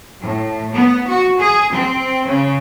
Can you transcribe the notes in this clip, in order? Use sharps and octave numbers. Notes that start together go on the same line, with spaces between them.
A2
B3
F#4
G#4
C4
C#3